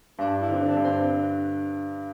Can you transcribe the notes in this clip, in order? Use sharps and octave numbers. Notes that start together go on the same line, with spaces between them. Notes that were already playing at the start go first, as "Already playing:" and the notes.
G2 D4
E4
D3 C4
D4
G2
C4